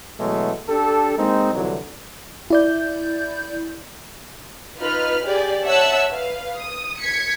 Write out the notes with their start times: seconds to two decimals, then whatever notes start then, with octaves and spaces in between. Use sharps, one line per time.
0.20 B2 E3 F#3 G#3 A3
0.69 D4 G4 A4
1.18 G#3 A#3 C4 D#4
1.53 C2 F2 D3 E3 F#3
2.50 E4 D5 G6
4.79 D#4 F4 B4 B5 F6
5.25 G4 G#4 D5
5.63 C#5 E5 F#5 A5 E6 F#6
6.11 B4 F5
6.57 D#6
7.01 G#6 B6 C#7